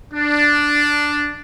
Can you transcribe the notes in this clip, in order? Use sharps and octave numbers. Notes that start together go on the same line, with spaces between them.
D4